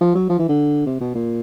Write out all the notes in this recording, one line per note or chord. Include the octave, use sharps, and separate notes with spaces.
F3
F#3
F3
E3
D3
C3
B2
A#2